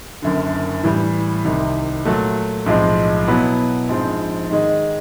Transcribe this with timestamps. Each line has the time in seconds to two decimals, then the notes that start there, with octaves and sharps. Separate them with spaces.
0.22 F#1 F#2 D3
0.83 A2 E3 G3
1.44 C2 C3 D#3
2.05 A#2 F#3 A3
2.66 B1 A2 F3 G#3 C4
3.28 B2 F#3 B3 E4
3.88 A#1 G#2 F3 G#3 C4
4.49 G#2 D#3 G#3